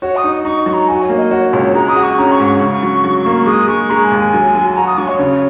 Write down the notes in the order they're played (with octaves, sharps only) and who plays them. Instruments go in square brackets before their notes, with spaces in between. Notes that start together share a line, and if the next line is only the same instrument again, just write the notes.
[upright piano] F#4 [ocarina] C#5
[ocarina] D#6
[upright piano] D#4
[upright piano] D#4 [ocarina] C#6
[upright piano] F#3 [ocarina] C#6
[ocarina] A#5
[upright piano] F#4 [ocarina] G#5
[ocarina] C#5
[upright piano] A#3
[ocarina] D#5
[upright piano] F#4 [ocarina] C#5
[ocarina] C#5
[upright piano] C#2
[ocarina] C#5
[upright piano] G#3 [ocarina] A#5
[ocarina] D#6
[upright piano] F#4
[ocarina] C#6
[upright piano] C#4 [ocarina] A#5
[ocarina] C#6
[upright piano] G#2
[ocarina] C#6
[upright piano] C#3
F#3
F#3
A#3
[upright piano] G#3 [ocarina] D#6
[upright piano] G#3 [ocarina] C#6
[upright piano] G#3 [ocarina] A#5
[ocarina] G#5
[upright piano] D#2
[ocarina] G#5
[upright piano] F#3
F#3
[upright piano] F#4 [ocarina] A#5
[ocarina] D#6
[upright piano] F#3 [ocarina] C#6
[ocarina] C#5
[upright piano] C#3